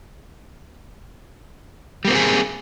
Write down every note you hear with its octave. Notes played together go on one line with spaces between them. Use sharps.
G3 A#3 C4 F#4 G#4